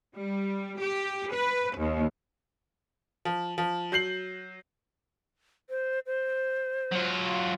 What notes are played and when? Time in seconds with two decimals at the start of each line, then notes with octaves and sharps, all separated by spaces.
0.15 G3
0.80 G4
1.33 B4
1.77 D#2
3.25 F3
3.58 F3
3.92 F#3 G6 C7 F#7
5.70 C5
6.06 C5
6.92 F#3 F4